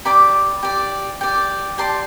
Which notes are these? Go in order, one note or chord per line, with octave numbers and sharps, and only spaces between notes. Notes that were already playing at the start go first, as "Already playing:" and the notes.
G4 D5 B5 D6
G4 D5
G4 D5
G4 D5 A5 C6